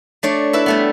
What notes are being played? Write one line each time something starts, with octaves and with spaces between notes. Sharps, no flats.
A3 D4 C#5
E4 B4 E5
G3 A3 B3